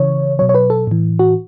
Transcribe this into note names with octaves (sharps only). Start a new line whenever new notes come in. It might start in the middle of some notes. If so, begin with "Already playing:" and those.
Already playing: C#3 E3 C#5
B2 F#3 C#5
C#5
B4
A4
A2 E3
F#4